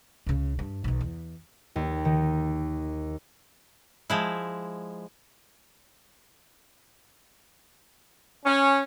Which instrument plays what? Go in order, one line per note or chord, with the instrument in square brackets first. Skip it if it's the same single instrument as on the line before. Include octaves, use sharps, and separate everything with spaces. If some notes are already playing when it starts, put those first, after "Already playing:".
[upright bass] C#2 C#3
G2
B1 D#3
E2
[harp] D#2
D#3
[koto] F3 G#3 E4
[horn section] C#4